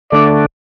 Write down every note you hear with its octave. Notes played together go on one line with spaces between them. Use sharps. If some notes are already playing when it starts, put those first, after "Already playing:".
D3 A3 D4 D5